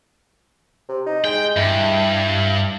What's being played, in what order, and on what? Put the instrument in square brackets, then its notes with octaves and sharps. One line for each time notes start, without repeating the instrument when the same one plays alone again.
[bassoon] C3
D#4
[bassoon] G#3 [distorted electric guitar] G5
[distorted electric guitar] G2 [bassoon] E4